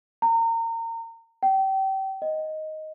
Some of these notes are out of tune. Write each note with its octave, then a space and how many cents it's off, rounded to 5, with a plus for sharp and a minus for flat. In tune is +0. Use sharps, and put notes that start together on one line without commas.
A#5 -30
G5 -30
D#5 +5